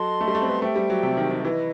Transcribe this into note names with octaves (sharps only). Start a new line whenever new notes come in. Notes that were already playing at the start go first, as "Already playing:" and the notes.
Already playing: F#3 A4 D#5 A5 C6
A3
G3
A3
C4
B3
A3 G4 C5 E5 G5
G3
F#3
C3
D#3
D#3
E3 E4 B4 D#5